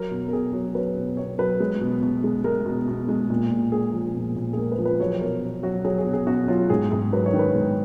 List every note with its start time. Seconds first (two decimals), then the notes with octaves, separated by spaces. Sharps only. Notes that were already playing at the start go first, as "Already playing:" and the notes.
Already playing: F#3 A#4
0.11 B2
0.28 A#4
0.33 B2 G#4
0.53 F#3
0.75 F#3 B4
0.96 B2
1.17 B2 C#5
1.39 F#3 B4
1.60 G#3
1.81 B2
2.03 B2
2.24 G#3
2.44 G#3 A#4
2.66 B2
2.88 B2
3.09 G#3
3.30 A#2
3.51 A#2
3.72 G#3 G#4
3.93 F3
4.15 A#2
4.36 A#2
4.53 G#4
4.57 G#3 A#4
4.72 B4
4.79 F3
4.85 B4
5.00 F#3 C#5
5.21 B2 A#4
5.43 B2
5.63 F#3 F#4
5.85 F#3 G#4
5.98 G#4
6.06 B2
6.13 G#4
6.27 B2 F#4
6.48 F#3 F4
6.70 G#2 G#4
6.91 G#2 G#4
7.12 F#3 B4
7.26 C#5
7.33 D#3
7.39 B4
7.55 G#2